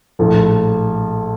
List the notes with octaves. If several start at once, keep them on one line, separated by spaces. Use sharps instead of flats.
A#1 A2 F3 A3